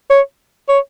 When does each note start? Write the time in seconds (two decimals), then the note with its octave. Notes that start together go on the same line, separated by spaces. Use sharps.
0.10 C#5
0.68 C#5